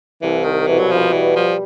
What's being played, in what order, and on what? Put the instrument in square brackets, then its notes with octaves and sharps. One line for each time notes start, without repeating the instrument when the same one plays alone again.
[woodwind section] C2 [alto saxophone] E3
[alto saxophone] D#3
[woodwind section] B2 [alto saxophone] E3
[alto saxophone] F#3
F3
[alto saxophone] E3 [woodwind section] G3
[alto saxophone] F3